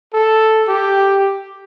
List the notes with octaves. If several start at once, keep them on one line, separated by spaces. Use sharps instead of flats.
A4
G4